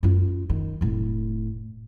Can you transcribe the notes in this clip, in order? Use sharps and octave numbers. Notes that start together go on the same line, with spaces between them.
F#2 F4
D#3
F1 A2